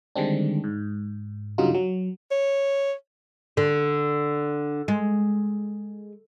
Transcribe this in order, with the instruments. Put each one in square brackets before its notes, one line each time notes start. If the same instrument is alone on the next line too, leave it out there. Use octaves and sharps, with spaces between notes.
[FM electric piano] D3 D#3 G3 G#3 C4 D4
G#2
G2 C#3 F#3 G3 D#4 F4
F#3
[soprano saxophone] C#5
[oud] D3
G#3